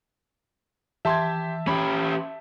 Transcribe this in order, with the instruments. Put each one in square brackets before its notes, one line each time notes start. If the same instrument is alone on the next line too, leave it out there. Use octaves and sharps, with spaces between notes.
[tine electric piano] E3 [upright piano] G4 C6 G#6 [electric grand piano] E5 A5
[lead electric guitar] C#4 G4 [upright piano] B5